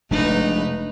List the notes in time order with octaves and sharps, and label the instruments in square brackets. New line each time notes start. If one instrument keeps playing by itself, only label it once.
[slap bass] F1 G#3 D4 [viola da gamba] A3 D#4 B4